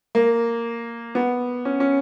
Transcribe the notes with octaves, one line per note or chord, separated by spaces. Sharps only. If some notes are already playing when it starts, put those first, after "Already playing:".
A#3
B3
C#4
C#4